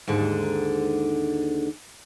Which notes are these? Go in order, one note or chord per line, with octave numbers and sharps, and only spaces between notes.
D#2 G#2 D3